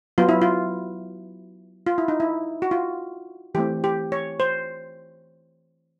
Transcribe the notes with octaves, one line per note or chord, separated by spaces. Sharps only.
F#3 B3 F4
E4
F4
F4
E4
D#4
E4
F#4
F4
E3 A3 C4 G4
G4
C#5
C5